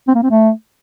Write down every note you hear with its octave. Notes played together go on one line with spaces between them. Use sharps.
C4
A#3
C4
A3